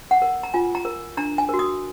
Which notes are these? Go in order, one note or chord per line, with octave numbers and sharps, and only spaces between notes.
F#5
A#4
A#5
F4 G#5
A#5
A#4
D4 A#5
G#5
F#4 A#4
D#6